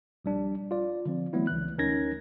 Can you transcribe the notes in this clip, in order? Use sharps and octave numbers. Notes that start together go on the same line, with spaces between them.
A#1 G3 D4
F4 D5
D3 F3 C4
E3 F#3 A3 B3 E4
C#2 E3 F#6
D2 C#4 D#4 A#4 G#6 A#6